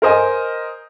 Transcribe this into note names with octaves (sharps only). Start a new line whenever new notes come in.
A#4 C5 D#5 G#5